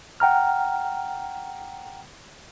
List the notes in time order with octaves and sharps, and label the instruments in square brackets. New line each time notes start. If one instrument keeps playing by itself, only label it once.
[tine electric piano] F#5 G5 A#5 F6